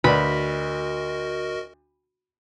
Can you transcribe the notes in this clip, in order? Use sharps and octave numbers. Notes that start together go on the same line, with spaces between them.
D2 F#4 A#4 B4 D5 D#5 B5